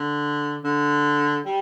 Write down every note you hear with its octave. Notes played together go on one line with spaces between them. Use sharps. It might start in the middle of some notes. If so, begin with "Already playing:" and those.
Already playing: D3
D3
G3